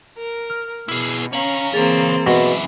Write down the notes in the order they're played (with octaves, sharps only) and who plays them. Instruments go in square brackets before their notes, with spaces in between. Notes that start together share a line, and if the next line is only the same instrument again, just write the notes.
[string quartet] A#4
[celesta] F6
[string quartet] B2 [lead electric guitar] E4 G#4
[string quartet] C#4 A#5 [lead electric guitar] C#5 F5 [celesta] F#7
[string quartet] E3 A#3 C4 [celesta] G#4 A6 F7
[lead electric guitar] F#2 E4 [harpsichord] B2